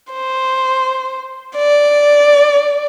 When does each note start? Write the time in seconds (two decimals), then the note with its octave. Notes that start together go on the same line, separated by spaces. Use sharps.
0.13 C5
1.56 D5